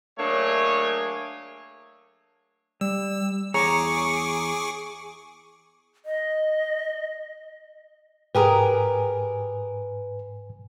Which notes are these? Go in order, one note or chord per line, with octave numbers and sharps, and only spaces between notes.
F#3 A3 A#3 D4 G#4 C#5
G3 E6
E2 G#4 C#5 A#5 C#6 D6
D#5
G#2 G4 G#4 A#4 B4 G#5